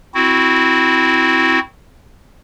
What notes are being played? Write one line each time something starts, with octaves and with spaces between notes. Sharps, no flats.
C4 E4 F#4